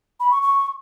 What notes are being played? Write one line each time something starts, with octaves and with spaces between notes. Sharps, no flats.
B5
C#6
C#6